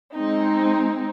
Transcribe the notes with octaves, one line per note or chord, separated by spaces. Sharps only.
G#3 C4 D#4